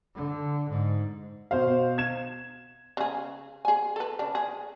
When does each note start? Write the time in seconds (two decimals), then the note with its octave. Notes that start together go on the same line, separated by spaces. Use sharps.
0.15 D3
0.70 G#2
1.51 B2 C5 F5
1.98 G#6 E7
2.97 C#3 G#4
3.65 G#4 G#5
3.96 A4 B4
4.19 C#3 D4
4.35 G#4